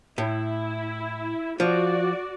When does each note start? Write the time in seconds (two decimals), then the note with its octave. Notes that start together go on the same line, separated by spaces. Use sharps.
0.18 A2 E4
1.60 F3 F#4 D5